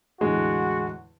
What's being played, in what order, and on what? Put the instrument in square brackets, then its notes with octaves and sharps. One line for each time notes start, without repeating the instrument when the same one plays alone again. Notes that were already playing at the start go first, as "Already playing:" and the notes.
[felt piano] E2 A2 D3 [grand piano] G#3 [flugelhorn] F#4